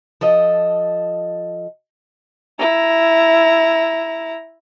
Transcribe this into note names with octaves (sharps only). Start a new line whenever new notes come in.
F3 A4 D#5
E4 A#5